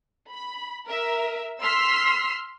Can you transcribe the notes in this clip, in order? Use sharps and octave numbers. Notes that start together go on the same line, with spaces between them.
B5
A#4 E5
C6 E6 F6 B6 C7